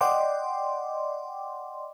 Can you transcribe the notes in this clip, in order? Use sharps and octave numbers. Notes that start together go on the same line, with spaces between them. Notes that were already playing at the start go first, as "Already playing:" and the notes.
D5 D#5 F#5 G5 C6 D6